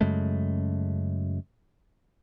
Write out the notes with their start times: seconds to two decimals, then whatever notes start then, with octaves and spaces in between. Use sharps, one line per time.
0.01 F#2 C#3 G#3 A3